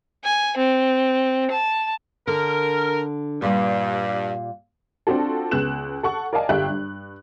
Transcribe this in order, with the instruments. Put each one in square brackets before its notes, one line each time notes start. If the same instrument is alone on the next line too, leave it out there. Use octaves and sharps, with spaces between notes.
[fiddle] G#5
C4
A5
[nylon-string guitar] D3 [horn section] A#4
[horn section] G2 [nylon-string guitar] A#2 G3
[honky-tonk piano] C4 D4 F4 F#4 A4
C#2 B3 F#6 E7
A4 F#5 C#6
A#4 D5 D#5 F5 G#5 A5
G1 G3 E5 F5 G5 F#6
G2